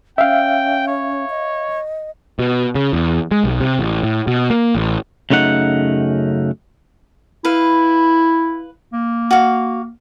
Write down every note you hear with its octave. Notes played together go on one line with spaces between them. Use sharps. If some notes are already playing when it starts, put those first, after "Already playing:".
C#4 E5 F5 G5
C#5
D#5
B2
C#3
E2
G#3
B1
C3
A1
A2
B2
A#3
A1
F#2 C#3 A3 D#4 F#5
E4 B4 F5
A#3
F#4 F5